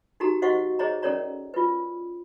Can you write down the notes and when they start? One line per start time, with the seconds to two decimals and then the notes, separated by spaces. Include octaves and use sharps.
0.20 D#4 F#4 G4 A4 A#5
0.42 F#4 C5 D#5 F5 F#5 C#6
0.79 G#4 C5 C#5 D#5 A#5
1.02 C#4 A4 A#4 C#5 D5 A#5
1.54 F4 B4